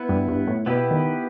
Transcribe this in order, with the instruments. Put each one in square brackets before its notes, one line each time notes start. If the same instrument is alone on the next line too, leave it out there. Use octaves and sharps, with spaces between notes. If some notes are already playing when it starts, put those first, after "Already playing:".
Already playing: [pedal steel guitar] B3 E4 B4
[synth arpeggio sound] G2
G2
A2
[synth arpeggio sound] B2 [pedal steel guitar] B3 E4 G4 B4
[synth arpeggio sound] D#3